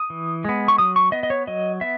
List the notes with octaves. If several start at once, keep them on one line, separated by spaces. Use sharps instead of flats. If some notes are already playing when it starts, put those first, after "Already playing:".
Already playing: D#6
E3
G#3 B3
C#6
F#3 D#6
C#6
B3 D#5
D#5
C#5
F#3 D#5
B3 E5